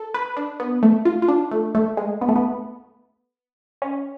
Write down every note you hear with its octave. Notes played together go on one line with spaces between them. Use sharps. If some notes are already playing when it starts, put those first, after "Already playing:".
Already playing: A4
B4
D4
B3
A3
F4
F4
D4
A3
A3
G#3
B3
A3
B3
C#4